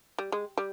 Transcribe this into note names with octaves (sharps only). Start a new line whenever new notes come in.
G3
G#3
G3